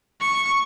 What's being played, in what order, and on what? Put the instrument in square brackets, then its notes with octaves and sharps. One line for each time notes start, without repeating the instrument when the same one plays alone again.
[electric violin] C#6